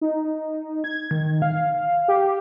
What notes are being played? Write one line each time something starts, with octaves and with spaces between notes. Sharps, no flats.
D#4
G#6
D#3
D#3
F5
G4